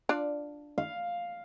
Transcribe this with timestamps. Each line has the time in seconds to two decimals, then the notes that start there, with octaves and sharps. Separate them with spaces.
0.09 D4 F4 D5
0.78 F5